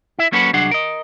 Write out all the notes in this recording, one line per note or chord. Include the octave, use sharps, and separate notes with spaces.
E4 E5
F#3 A#3 C#4 F#4 A4 B4
C2 F#3 D4 G#4 F#5
A#4 D#5